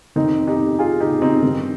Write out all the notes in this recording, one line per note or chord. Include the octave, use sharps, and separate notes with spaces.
F2 C3 D#3 C4 D#4
D#4 G4
F4 G#4
D#4 G4
C4 D#4
G2 D#3